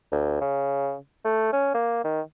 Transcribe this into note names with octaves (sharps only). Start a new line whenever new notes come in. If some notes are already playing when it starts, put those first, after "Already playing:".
D2
C#3
A3
C#4
A#3
D#3